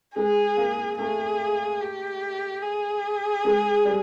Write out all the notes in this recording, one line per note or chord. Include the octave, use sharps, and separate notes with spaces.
G#3 G#4
A#3
A3 G#4
G4
G#4
G#3
G3